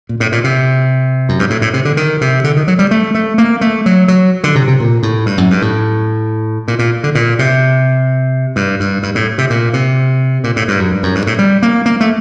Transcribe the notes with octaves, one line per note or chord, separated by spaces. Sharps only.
A#2
A2
A#2
C3
F#2
G2
A2
A2
C3
D3
D#3
C3
D3
D#3
F#3
G3
A3
A3
A#3
A3
F#3
F#3
D3
C3
C3
A#2
A2
G2
F#2
G2
A2
A#2
A#2
D3
A#2
C3
G2
G2
G2
A2
C3
A#2
C3
A#2
A2
G2
F#2
G2
F#2
G2
A2
G3
A#3
A#3
A3